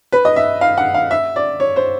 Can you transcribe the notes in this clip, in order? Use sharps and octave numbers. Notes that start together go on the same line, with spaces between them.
B4
D#5
E5
F5
F#5
F5
E5
D5
C#5
C5